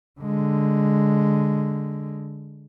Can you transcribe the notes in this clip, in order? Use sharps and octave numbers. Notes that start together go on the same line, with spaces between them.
D3 G#3